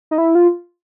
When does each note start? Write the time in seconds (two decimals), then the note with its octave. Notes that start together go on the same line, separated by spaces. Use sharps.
0.11 D#4
0.18 E4
0.35 F4